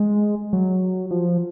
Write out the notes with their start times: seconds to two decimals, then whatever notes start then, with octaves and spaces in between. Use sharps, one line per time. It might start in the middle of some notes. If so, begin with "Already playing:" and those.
Already playing: G#3
0.53 F#3
1.11 F3